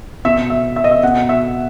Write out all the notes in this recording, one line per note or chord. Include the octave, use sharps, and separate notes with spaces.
B2 E5
E5
E5
D#5
E5
B2 F#5
E5